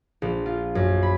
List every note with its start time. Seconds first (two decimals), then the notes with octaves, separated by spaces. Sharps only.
0.22 A#1
0.46 F4
0.75 F#2
1.03 B5